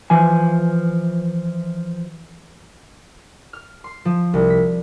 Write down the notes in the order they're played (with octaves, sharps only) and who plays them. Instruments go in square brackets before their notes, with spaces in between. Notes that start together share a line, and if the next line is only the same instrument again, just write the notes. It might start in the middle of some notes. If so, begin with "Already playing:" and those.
[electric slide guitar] E3 F3 G#5
[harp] F6
C6
F3
C2
B6